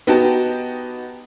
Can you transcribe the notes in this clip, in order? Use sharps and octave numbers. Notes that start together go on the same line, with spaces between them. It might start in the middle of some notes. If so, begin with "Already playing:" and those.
B3 D#4 F#4 G4 G5 A5